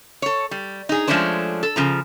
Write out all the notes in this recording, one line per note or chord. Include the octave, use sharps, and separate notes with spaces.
A4 C#5
G3
D#4 G#4
F3 G#3 A3 C#4 D4 C5
A4
C#3 F3 A#5